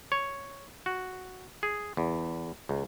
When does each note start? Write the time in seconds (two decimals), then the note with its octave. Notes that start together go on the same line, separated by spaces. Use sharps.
0.12 C#5
0.86 F#4
1.63 G#4
1.97 E2
2.69 C#2